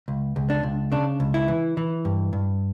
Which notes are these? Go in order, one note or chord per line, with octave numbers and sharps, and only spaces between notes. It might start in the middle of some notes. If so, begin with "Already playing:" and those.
C#2
C#2
D4
C#2
C#3 D4
C#2
E4
E3
E3
G2
G2